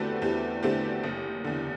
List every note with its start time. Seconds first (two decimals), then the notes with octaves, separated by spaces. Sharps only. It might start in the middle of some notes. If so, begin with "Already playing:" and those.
Already playing: E2 D3 A3 C4 F#4 G4 A4 B4
0.22 E2 G4
0.63 D3 A3 C4 G4
1.03 F#1
1.44 E2 D3